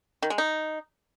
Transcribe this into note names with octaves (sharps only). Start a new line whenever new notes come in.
D#3
G#3
D#4